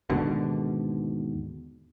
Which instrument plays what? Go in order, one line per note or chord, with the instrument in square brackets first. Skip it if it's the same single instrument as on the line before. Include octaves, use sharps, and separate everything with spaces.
[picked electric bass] D#2 G#2 B2 D3